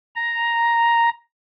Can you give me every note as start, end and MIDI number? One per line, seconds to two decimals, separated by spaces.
0.16 1.10 82